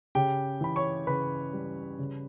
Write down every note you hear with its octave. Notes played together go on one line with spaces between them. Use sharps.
C#3 G4 G5
E3 B5
C#5 C#6
C#3 B4 B5
G3
C#3